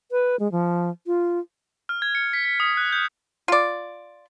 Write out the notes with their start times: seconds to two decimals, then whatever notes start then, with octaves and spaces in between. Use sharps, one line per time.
0.11 B4
0.40 G#3
0.52 F3
1.07 F4
1.89 F6
2.02 G#6
2.15 C#7
2.33 B6
2.45 B6
2.60 D#6
2.77 F#6
2.92 G6
3.48 F4 D5